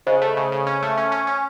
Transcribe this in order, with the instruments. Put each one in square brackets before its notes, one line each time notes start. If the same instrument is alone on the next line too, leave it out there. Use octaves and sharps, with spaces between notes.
[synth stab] C#3 [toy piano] C5 D#5
[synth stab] A3
C#3
C#3
C#4
A3
C#4
C#4
C#4